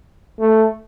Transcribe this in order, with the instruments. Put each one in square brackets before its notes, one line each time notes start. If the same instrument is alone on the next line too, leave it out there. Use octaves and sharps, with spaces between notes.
[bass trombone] A3